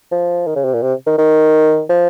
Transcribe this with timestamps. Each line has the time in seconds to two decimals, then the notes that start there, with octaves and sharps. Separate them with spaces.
0.12 F3
0.47 D#3
0.56 C#3
0.65 C3
0.74 A#2
0.82 C3
1.06 D#3
1.18 D#3
1.89 F3